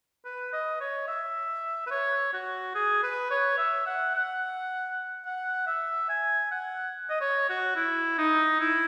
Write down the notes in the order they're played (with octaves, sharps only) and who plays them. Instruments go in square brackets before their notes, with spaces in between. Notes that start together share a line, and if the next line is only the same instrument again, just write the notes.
[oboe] B4
D#5
C#5
E5
B4
C#5
F#4
G#4
B4
C#5
E5
F#5
F#5
F#5
E5
G#5
F#5
D#5
C#5
F#4
E4
D#4
E4